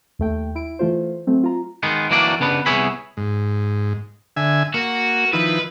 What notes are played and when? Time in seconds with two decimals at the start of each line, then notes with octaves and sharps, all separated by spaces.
0.19 D#2 A3 G5
0.55 E4 D7
0.79 E3 A3 F4 C5
1.27 F#3 A3 C4
1.44 F4 A#5
1.83 D#3 G#3 B3
2.11 E3 F#3 A#3 D4 D5
2.40 C#3 B3 D4 B4
2.66 C2 B3 G#4 C#5 E5 B5
3.17 G#2
4.36 D3 E5 G#5
4.74 A#3 F#4
5.33 D#3 F3 E4 B4